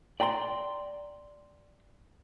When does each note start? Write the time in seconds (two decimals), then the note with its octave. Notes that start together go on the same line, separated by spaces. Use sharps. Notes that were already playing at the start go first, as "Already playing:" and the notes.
0.20 D5 G5 A#5 C6